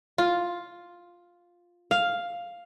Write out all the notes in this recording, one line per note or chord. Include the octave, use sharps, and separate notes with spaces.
F4
F5